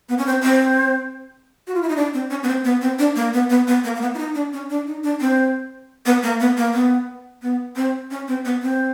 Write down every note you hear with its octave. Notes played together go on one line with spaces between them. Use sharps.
B3
C#4
C4
C4
F#4
F4
E4
D#4
D4
C4
C#4
B3
C4
B3
C4
D4
A#3
B3
B3
B3
A#3
A#3
B3
E4
D#4
D4
C#4
D4
D#4
D4
C4
B3
A#3
B3
A#3
B3
B3
C4
C#4
C4
B3
C4